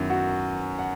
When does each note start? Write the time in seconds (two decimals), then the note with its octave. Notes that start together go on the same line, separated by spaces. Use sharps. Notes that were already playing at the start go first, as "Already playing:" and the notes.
Already playing: F#2 D#3 B3 E4
0.10 F#4 F#5
0.79 F#5